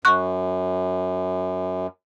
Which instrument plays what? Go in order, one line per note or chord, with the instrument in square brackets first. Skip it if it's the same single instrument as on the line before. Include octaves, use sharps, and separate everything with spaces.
[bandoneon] F#2 [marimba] C#6 F#6